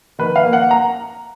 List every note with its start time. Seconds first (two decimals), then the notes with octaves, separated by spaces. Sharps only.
0.19 D#3 B4
0.36 F5
0.45 A#3
0.53 F#5
0.71 A#5